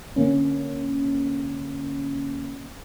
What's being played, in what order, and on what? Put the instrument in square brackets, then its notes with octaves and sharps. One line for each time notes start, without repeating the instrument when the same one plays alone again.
[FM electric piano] D3 A#3 C#4